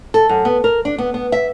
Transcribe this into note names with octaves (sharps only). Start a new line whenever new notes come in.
A4
F#2
B3
A#4
D4
B3
B3
E5